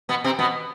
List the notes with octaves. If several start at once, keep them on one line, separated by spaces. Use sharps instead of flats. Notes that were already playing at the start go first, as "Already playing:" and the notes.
B2 B3
C3 C4
B2 B3